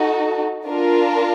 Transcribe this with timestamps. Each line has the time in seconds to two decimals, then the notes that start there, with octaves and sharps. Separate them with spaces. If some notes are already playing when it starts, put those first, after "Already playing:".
Already playing: D#4 F#4 A4
0.67 D4 F4 A#4